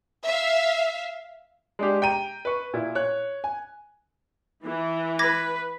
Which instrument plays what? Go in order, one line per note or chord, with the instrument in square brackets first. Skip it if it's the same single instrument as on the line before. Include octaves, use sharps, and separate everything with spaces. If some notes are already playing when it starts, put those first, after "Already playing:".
[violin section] E5 F5
[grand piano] G#3 D4 G4
G5 A#5 D#7
B4 C#6
A#2 E4
C#5 F#6
G#5
[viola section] E3
[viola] B4 [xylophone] D6 G#6 A#6